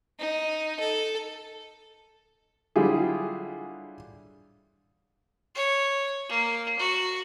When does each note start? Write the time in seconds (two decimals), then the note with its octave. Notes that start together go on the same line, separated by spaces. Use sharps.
0.19 D#4
0.80 A4
2.76 D3 F#3 G3 E4 F4 G#4
5.55 C#5
6.29 A#3
6.79 F#4